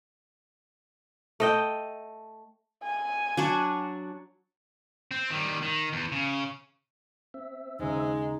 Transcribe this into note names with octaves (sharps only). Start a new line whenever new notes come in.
A3 D#5 G5
G#5
F#3 D4 F#4
C4
D#3 G3
D#3
E2
C#3
C4 E5
D#2 C#3 G#3 D#4